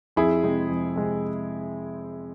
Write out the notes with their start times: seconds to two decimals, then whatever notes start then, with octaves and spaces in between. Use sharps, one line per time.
0.16 F2 E4 G#4
0.43 C3 G#3 C4
0.69 F2
0.96 C3 G#3 C4